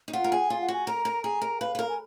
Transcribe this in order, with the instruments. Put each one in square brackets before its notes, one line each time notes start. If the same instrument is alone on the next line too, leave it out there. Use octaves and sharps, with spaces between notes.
[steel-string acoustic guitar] D#4
[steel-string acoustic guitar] F4 [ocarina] F#5
[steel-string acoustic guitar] A#4
G#4
[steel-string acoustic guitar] F4 [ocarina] G#5
[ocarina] F#5
[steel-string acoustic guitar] F#4 [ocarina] G#5
[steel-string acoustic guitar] A#4 [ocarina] A#5
[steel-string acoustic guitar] A#4
[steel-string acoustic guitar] G#4 [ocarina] A#5
[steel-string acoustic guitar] A#4
[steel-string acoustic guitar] B4 [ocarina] F5
[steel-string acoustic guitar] B4
A#4
[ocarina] G#5